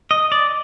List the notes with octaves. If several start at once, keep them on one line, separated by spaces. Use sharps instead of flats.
D#5
D5